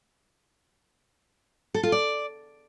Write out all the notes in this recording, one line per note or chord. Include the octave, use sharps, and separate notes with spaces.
A4
F4
D5